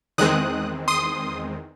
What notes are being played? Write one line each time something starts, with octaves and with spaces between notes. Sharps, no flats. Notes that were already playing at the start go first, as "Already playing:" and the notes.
E2 D#3 G#3 C4 D#6 F#6
C6 D#6